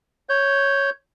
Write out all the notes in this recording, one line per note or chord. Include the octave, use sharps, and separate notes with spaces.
C#5 G6